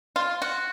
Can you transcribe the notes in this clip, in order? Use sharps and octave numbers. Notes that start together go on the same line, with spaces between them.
F4
F#4